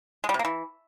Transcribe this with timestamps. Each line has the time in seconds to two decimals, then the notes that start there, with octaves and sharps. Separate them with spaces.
0.24 G#3
0.29 G3
0.34 C3
0.39 A#3
0.45 E3